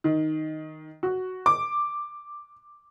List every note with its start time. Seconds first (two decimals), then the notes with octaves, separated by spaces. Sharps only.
0.04 D#3
1.03 F#4
1.46 D6